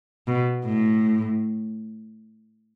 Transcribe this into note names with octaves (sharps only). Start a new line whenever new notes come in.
B2
A2